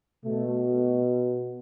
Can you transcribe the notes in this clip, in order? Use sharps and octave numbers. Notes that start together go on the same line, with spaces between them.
B2 A3